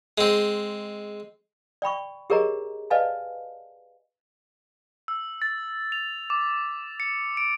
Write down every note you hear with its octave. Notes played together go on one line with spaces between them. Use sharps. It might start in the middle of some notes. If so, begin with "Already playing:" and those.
G#3 C4
D5 G5 B5 C#6
G4 G#4 A#4 C#5 D#5 A#5
B4 D5 D#5 F5 G#5 A5
E6
A6
F7
D6
C#7
D7